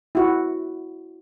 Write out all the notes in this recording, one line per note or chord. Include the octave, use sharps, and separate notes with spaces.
E4 F#4